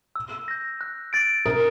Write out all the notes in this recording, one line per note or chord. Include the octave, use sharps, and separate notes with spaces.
E6
G6 A#6
F#6
A6 D7
A#4 D#6